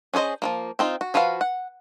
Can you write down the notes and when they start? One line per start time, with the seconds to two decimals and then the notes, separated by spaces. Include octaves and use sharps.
0.13 C#4 D4 G#4 C5 D#5
0.42 F3 F#3 A#3
0.79 C4 D#4 F4
1.01 F#4
1.14 F3 F4 F#4 B4 F5
1.41 F#5